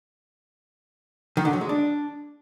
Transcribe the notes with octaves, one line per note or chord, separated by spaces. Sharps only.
D#3
D3
F#3
G#3
D4